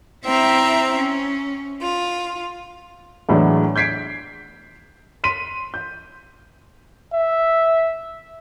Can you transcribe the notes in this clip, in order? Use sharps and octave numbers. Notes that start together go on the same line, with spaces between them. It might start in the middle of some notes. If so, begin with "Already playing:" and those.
C4 E4 C5 E5 G5 A#5
C#4
F4
E2 A2 E3 F#3 G#3 D4
G6 G#6 B6 C7 D7
C6 B6 D#7
G6
E5